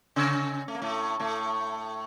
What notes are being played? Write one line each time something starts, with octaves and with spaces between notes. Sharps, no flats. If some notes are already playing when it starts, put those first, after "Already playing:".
C#3 C#4
A3
A#3
A2 A3
A2 A3